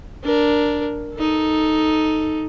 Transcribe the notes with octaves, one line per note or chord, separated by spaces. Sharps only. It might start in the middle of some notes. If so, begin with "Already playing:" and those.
D4 A#4
D#4 A4